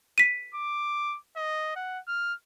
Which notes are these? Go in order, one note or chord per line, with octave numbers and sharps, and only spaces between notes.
B6 D#7
D6
D#5
F#5
F6